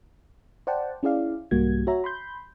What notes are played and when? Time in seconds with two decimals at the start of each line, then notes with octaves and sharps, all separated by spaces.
0.67 C5 D5 F#5 G5 A5
1.03 C#4 E4 G#4 D5 F5
1.51 C2 G#2 G3 A#3 F#4 G#6
1.87 F#4 C#5 E5 A#5
2.04 B5 C6 G6